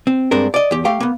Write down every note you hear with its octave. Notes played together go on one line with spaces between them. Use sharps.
C4
G2 G#3 C4 D4 A#4
D5 D#5
E2 G4
A3 G4 F5 G5
A#3 B3